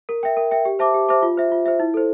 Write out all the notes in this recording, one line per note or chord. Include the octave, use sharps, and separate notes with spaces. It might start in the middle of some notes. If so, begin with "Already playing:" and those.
A#4
E5 G5
A#4
E5 G5
G4
C5 E5 A5 D6
G4
C5 E5 A5 D6
F4
C5 E5
F4
C5 E5
E4
A4 C5